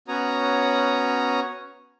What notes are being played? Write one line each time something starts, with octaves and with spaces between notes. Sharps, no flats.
B3 C#4 F#4 C#5 A#5 D#6